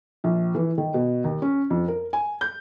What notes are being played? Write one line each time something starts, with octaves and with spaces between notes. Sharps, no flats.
A#1
E3
D#3
B2
D#2
C#4
F2
A#4
G#5
G6